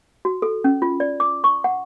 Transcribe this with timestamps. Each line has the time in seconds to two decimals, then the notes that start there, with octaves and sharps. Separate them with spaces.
0.25 F#4
0.42 A4
0.64 C#4
0.82 F4
1.00 D5
1.20 D6
1.44 C#6
1.64 F#5